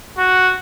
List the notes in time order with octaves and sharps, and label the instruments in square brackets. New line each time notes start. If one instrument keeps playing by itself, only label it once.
[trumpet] F#4